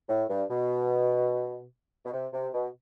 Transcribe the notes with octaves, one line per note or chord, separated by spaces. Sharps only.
A2
G2
B2
B2
C3
C3
B2